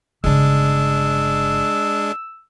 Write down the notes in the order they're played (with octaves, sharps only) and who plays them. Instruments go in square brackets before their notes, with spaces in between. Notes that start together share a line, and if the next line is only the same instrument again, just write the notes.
[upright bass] G1 C#3 [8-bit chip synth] G#3 D4 [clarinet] E6